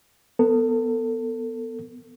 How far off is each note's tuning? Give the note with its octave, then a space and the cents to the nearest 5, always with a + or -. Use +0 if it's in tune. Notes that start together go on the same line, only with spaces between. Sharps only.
B3 +0 A4 +30